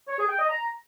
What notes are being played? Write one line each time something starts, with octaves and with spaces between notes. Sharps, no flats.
C#5
G#4
G5
D#5
A#5